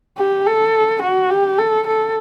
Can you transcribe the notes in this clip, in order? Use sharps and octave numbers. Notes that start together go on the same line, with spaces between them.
G4
A4
F#4
G4
A4
A4